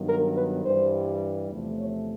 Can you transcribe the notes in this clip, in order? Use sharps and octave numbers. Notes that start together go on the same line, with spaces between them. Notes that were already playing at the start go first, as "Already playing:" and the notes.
Already playing: G2 D#3 F#3 B3
A#4
B4
G2 E3 G3 C5
E2 C3 F3 A3
C#5